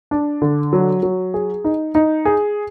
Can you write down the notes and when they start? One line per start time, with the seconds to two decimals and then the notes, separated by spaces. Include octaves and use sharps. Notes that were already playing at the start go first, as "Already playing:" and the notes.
0.11 D4
0.42 D3
0.73 F#3
1.03 F#3
1.34 G#4
1.64 D#4
1.95 D#4
2.25 G#4